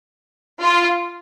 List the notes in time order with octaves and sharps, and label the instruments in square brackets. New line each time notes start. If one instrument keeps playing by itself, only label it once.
[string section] F4